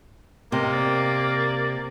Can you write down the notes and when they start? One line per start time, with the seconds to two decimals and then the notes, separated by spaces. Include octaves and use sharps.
0.52 C3 A#3 D#5
0.73 D5